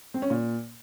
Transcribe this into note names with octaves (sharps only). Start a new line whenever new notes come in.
C4
C#4
A#2